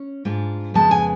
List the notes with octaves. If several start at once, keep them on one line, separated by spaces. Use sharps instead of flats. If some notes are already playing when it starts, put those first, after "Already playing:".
Already playing: C#4
G#2 G#3 D4 F4
F2 C#3 G#3 B3 A5
G#5